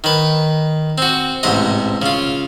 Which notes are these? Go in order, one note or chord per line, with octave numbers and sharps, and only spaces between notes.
D#3 B4
C4 F#4
A1 G#2 C3 D#5
C#3 F4